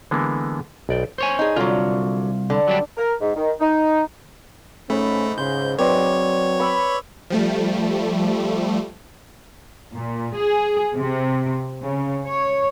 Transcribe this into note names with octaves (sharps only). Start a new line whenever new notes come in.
D3 E3 G#3 A#3 B3
B1 D5 G5
C5 C#5 G#5
D#4 G#4
C2 D3 F#3 F4
D3
F#3 G3 D4
A#4
G#2
D#3
D#4
G#2 A3 C#4 B5
C#3 C6 G6
F#3 C4 B4 C#5 D5
B5 C#6 D6 E6
F3 G3 A3
A#2
G#4
C3
C#3
C#5